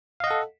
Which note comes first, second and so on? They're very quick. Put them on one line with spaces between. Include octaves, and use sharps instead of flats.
F5 D#5 F#5 A4